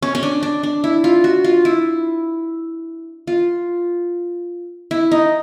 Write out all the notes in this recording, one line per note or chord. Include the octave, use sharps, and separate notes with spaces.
C#4
C#4
D4
D4
D4
E4
F4
F#4
F4
E4
F4
E4
D#4